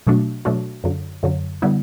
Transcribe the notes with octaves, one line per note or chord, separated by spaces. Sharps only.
B2 F#3 A3 D4 F#4
B2 F#3 A3 D4 F#4
F#2 D3 F#3
F#2 D3 F#3
D3 G3 B3 E4